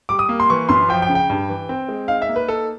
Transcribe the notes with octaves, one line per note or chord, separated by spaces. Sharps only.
G3 D6
D#6
A#3
C6
E3 C#6
F#2 C6
F3 G5
G5
C#3
G5
G2
E3
C4
G#3
D#4 F5
E5
A#3
B4
D#4 A4